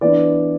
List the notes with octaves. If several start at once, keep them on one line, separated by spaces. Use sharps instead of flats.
E3 B3 D4 D5